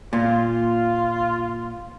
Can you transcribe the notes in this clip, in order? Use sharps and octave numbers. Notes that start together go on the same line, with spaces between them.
A#2 F4